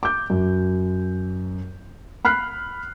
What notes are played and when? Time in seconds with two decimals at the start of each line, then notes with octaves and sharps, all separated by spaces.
0.03 D6 G6
0.30 F#2
2.25 B5 F6 F#6 C7